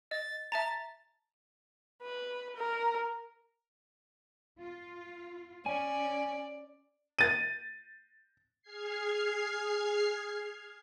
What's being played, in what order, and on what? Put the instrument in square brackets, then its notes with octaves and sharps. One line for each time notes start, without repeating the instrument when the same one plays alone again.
[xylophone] D#5 [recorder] A6
[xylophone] E5 A5 A#5 [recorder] A6
[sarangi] B4
A#4
[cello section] F4
[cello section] C#4 [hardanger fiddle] D5 [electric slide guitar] G#5
[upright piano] A6 D#7
[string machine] G#4 F6 G#6 C7